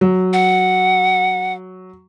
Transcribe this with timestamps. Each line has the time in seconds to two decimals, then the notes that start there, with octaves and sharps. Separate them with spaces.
0.01 F#3
0.33 F#5